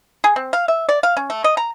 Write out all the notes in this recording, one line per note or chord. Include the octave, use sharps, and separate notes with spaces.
G#4
C4
F5
E5
D5
F5
C#4
A3
D#5
A#5